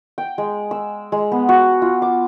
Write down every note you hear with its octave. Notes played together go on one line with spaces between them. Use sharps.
G5
G#3
E6
G#3
B3
F#4
F4
D6